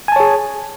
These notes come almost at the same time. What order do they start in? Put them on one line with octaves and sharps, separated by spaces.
G#5 A5 C#5 G#4